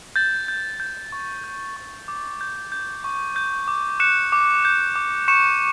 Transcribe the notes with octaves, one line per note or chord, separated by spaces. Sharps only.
G6 A6
G6
G6
C#6
G6
C#6
D6
G6
G6
C#6
G6
D6
F#6 C#7 E7
D6
G6
D6
C#6 C#7 E7